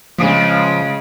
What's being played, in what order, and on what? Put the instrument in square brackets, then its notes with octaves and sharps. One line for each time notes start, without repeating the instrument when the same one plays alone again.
[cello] C#3 G#3 [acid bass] F3